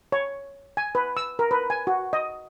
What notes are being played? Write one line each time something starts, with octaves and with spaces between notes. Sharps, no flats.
C#5
G#5
B4
E6
A#4
B4
G#5
F#4
D#5